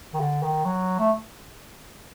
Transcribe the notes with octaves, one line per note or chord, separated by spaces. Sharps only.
D#3
D3
D#3
F#3
A3